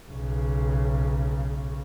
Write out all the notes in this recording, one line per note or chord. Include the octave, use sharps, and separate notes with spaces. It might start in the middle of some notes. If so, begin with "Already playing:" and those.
B1 C#3